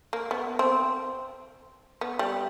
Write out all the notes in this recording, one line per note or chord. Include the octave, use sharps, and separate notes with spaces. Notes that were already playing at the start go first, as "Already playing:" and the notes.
A#3
B3
C4
B3
G3